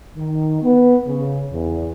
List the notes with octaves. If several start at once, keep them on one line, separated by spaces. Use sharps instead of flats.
D#3
B3
C#3
E2